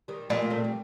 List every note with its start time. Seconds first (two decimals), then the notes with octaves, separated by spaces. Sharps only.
0.08 D#3 G3
0.30 A#2 F3 A3
0.42 A#3
0.50 A3 C4
0.64 G3